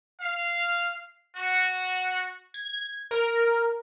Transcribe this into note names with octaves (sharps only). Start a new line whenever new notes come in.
F5
F#4
G#6
A#4